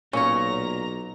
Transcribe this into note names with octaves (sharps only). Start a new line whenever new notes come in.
B1 A#2 C#4 C#5 A#5